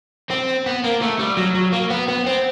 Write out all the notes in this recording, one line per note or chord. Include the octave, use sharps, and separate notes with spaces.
C4
B3
A#3
A3
G3
F#3
F#3
A#3
B3
B3
C4